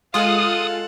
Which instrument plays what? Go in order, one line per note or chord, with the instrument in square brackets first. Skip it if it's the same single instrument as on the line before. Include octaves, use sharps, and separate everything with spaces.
[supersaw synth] G#3 F4 [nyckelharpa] A4 F#5 [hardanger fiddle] F5 [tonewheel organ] D#6